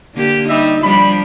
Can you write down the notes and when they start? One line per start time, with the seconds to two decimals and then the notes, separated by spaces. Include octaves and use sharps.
0.15 D3 A#3 G4
0.49 G3 D#4 E5
0.82 F3 G3 D4 B5